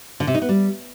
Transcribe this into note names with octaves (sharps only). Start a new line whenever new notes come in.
D3
C3
D#4
B3
G3